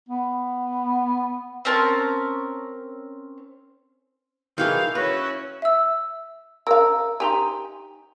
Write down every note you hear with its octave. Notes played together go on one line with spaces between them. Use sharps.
B3
C4 C#4 A#4 A5
D#3 E3 G#4 F5 G5
C#4 E4 F#4 B4
E5 E6
A#4 F5 E6
D#4 G4 G#5 A#5 C6